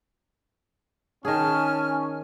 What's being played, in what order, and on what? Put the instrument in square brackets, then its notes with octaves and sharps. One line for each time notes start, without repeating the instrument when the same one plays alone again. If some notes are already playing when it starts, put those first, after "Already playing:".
[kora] D#3 G#4 [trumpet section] C#4 [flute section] G#5 A5 F6